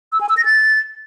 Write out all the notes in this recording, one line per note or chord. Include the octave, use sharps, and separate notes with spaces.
E6
G#5
E6
A#6
A6